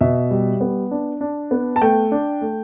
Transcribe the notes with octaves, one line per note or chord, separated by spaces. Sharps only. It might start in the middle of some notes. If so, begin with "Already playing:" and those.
B2 E5
G3
B3
D4
D4
B3
A5
A3 G5
D4
A3